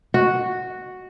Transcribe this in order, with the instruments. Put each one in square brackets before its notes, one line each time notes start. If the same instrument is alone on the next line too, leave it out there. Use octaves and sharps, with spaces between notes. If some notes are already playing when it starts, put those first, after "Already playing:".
[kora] F#4